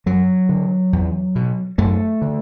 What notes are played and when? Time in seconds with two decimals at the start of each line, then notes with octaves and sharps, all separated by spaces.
0.06 F#2 F#3
0.49 D3
0.93 E2
1.35 B2
1.78 F#2 A3
2.22 D3